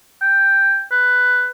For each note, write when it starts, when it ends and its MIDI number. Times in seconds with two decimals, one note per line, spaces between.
0.22 0.83 79
0.92 1.48 71